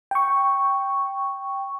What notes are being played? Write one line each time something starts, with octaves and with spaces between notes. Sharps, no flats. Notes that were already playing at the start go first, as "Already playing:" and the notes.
G5 C#6